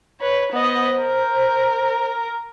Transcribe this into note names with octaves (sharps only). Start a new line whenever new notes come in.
B4 C#5
B3 C5 D#5
A#4